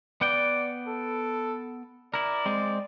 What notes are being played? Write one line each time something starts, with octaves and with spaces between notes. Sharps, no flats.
B3 D5 F#5 G5
A4
E4 A#4 D5
G#3 C4